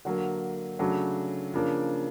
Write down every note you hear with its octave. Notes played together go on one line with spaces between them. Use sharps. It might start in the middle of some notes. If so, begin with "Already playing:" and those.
D3 F#3 A#3
C#3 F#3 A3 D4
C#3 F3 A#3 D4